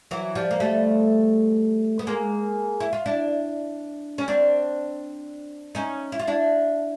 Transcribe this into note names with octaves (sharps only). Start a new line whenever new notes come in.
E3 F#3
F3 G3
A#3
G3 A3
B3
G#3 A#3
E4
F4
D4 E4
C#4
C4 D4
C#4 D#4
E4
F4
D4 E4